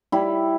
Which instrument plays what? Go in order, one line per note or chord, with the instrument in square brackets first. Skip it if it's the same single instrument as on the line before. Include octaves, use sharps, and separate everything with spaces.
[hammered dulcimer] G3 E4